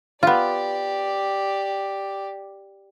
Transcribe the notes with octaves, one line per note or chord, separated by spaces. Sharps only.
B3 F4 G4 D5